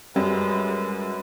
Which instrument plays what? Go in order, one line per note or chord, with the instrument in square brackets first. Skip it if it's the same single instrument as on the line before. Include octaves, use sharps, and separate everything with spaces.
[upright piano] F#2 [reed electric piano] G3 [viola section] G#3 F#4 [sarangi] B4